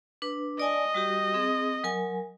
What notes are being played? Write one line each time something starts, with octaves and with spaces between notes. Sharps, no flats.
D4 B4
D5 D#5 G#5 A5
G3 F#4 G4
C4 G#4
F#3 A#4 G#5